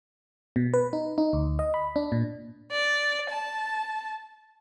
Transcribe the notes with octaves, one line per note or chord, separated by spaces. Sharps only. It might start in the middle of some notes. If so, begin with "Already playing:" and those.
B2
B4
D#4
D#4
D2
D#5
B5
D4
A#2
D5
A5